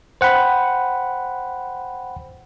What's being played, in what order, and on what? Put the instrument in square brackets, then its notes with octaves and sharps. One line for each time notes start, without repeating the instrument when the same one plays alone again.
[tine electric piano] C5 F#5 G5 B5